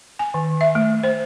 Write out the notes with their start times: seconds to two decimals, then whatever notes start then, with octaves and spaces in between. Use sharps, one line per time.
0.19 G#5
0.34 D#3
0.61 E5
0.75 A3
1.04 C5